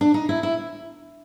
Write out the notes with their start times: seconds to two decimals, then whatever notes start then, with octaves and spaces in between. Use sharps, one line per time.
0.01 D4
0.14 D#4
0.29 E4
0.43 E4